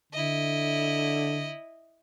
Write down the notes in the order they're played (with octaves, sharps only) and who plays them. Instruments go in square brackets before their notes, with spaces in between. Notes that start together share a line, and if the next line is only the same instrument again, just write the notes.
[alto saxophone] D3 [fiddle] E4 D#5